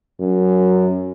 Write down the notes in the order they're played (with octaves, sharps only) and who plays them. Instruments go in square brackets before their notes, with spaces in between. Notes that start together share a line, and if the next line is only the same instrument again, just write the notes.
[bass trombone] F#2